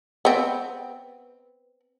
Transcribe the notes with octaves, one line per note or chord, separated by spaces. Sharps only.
B3 C4